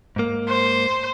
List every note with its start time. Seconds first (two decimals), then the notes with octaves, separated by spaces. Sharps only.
0.16 G#2 A#3
0.49 C5